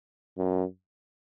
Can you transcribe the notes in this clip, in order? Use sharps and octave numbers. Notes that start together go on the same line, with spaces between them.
F#2